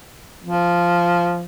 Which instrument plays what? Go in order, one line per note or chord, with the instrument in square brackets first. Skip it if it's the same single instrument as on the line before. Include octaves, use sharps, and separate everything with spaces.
[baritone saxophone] F3